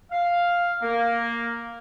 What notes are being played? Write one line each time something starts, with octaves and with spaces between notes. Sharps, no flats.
F5
A#3